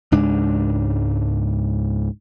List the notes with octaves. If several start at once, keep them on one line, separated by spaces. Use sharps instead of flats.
C#2 G#2 D4